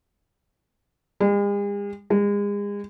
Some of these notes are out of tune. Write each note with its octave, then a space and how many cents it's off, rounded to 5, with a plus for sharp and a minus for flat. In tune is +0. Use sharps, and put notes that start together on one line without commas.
G#3 -45
G#3 -35